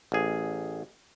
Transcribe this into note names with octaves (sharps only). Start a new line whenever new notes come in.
A1 G#4